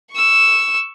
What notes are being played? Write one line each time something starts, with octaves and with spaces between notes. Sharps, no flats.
C#6 E6